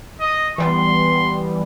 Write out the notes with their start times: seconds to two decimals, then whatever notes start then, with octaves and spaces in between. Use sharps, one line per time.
0.20 D#5
0.58 E3 G3 B3 C6